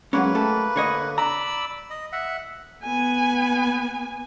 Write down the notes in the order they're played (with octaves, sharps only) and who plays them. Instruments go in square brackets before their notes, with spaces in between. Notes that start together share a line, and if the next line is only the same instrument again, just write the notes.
[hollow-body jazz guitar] F#3 G#3 C#4 [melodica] A#3 B4
[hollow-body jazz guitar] A3 G4 A4
D3 C#5 D#5
[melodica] D5 B5 E6 [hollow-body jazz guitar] A#5
[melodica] D#5
E5 F#5
[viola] B3 G#5